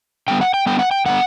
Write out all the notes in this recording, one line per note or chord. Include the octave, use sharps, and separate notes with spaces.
D3 G3 B3 G5
F#5
G5
D3 G3 B3 G5
F#5
G5
D3 G3 B3 F#5